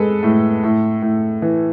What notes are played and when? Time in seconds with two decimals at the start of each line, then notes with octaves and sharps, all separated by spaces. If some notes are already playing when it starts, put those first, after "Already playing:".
Already playing: G#3 G#4 A4 B4
0.23 A2
0.64 A2
1.02 A2
1.42 E3